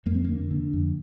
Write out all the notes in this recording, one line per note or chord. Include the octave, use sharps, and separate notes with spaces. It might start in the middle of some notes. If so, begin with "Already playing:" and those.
F2 A#3
C4
D3 A#3
D3
F2